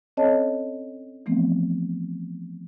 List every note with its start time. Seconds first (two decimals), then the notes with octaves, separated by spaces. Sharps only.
0.17 C4 C#4 A4 C#5 D#5 A5
1.26 E3 F3 A3 B3 C4